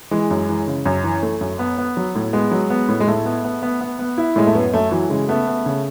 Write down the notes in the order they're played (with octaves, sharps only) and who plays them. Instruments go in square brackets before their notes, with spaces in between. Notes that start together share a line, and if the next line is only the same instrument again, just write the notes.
[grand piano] E3 [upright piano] G#3
[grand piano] F#2
E3
C#3
F#2
E3
A3
F#2
B3
B3
F#3
A2
[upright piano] G#3 [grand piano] B3
[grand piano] F#3
B3
A2
[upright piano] G#3
[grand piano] A2 [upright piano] A3
[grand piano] B3
B3
B3
B3
B3
E4
[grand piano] A2 [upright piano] G#3
[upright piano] A3
[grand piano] F#2 [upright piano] B3
[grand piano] F#2 [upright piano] A3
[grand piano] E3 [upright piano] F#3
[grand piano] C#3 [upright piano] G#3
[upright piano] A3 [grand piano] B3
[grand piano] B3
C#3